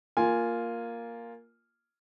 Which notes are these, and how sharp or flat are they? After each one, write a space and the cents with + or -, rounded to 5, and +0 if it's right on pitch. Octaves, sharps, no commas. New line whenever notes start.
A#3 +0 F4 +0 G#5 +0